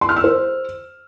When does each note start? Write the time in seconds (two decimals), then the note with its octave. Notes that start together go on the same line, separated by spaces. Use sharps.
0.01 C6
0.09 F6
0.16 E6
0.24 C5